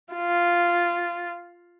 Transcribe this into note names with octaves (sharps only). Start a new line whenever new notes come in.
F4